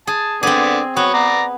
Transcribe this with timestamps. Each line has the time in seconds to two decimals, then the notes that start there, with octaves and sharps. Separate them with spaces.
0.07 G#4 A5
0.43 D3 B3 C4 G#4 D5
0.97 B3 F#4 C#5
1.14 D5 A#5